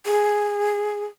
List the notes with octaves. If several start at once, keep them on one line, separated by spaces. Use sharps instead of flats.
G#4